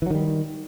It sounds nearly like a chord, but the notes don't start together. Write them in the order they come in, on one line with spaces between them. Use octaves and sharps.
E3 F#3 D#3 G3